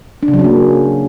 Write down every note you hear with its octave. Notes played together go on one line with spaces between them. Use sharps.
D4
C#3
F#3
C#4
A#3